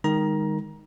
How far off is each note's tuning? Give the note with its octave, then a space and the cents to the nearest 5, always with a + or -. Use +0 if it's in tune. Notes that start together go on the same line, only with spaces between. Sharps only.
D#3 +0 G#3 -30 A#5 +20